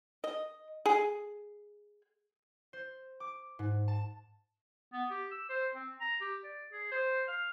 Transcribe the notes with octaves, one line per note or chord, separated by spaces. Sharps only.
D#5
G#4
C5
D6
G#2
A5
B3
G4
E6
C5
C4
A#5
G4
D5
G#4
C5
F5